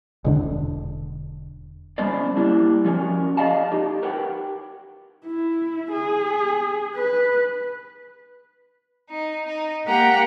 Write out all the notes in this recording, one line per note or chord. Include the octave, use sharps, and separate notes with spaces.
E1 D3 D4
G3 B3 C#4 D4 C5 D5
G3 A#3 D4 E4 G4 D5
F3 A3 C#4 F#4 A#4 D5
G#4 D5 D#5 F5 A5
D#4 G4
G4 A#4 B4 C#5 F#5 G5
E4
G#4
B4
D#4
D#4
A#3 G4 F#5 G5 A#5